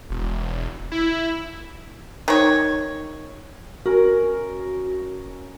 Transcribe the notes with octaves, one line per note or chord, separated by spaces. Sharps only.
E1
E4
D#3 C#5
C#4 F#4 A#4